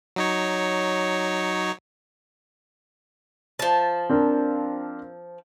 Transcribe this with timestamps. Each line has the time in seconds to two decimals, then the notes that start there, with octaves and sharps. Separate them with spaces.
0.16 F#3 D#4 C#5
3.59 F3 A5
4.10 C4 D4 A#4